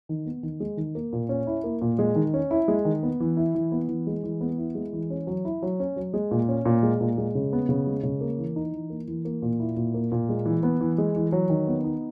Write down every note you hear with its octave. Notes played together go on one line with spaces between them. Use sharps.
D#3
B3
D#3
G#3
D#3
A#3
A#2
C#4
E4
A#3
A#2
G#3
D#3
C#4
E4
G#3
D#3
B3
E3
E4
E3
B3
E3
G#3
E3
B3
E4
G#3
E3
C#4
F#3
E4
F#3
C#4
F#3
G#3
A#2
C#4
A#2
G#3
A#2
G#3
C#3
B3
C#3
G#3
C#3
A#3
E3
D#4
E3
A#3
E3
A#3
A#2
E4
A#2
A#3
A#2
G#3
E3
B3
E3
G#3
E3
F#3
D#3
B3
D#4